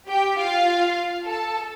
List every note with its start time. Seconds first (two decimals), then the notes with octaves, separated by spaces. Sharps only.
0.08 G4 G5
0.38 F4 F5
1.25 A4 A5